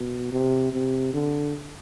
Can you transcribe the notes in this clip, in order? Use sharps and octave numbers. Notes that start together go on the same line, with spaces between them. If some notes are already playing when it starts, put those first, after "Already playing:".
Already playing: B2
C3
C3
D3